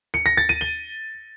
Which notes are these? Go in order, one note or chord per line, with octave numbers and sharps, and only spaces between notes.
C#7
A#6
A6
D#7
G7